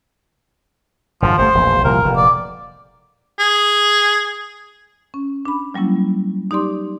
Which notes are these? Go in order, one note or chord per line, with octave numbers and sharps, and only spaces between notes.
G#1 F#2 D3 F3
G1 F2 A3 C5
E1 A#1
C2 A#2 F3 A#4
F1 A#2
D5
G#4
C#4
D4 B5
F#3 G3 A#3 C#4 E4
D#4 G4 D5 C6 D6